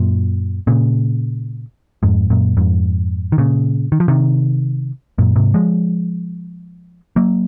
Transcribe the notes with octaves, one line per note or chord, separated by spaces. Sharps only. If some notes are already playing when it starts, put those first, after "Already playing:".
Already playing: F#2 A#2
A#2 C#3
F2 G#2
F#2 A#2
F2 G#2
D#3
A#2 C#3
D#3
F3
C3 D#3
F#2 A#2
G#2 C3
F3 G#3
F#3 A#3